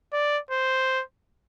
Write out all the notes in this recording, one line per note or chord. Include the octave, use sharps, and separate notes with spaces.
D5
C5